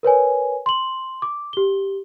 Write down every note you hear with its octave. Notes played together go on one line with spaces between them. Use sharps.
A#4 B4 C#5 G#5
C6 F#7
D6
G4 G7